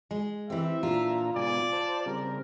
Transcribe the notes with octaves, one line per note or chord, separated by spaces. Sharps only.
G#3
E3 C4 G4 E5
A#2 D4 F4 A#5
G#2 B2 D5 G#5
C5 A5
C#3 G3 C4 A#4